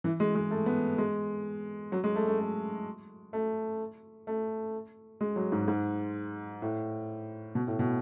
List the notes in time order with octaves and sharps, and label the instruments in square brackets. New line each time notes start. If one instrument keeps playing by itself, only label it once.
[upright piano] E3
G#3
G#3
A3
B3
G#3
F#3
G#3
A3
A3
A3
A3
A3
G#3
F#3
G#2
G#2
A2
B2
A2
B2